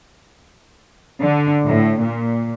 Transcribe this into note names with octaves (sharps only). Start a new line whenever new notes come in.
D3
A2
A#2